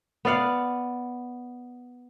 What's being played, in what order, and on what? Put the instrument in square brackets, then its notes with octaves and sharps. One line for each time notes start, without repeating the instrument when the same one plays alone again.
[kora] B3 D5 F5 F#5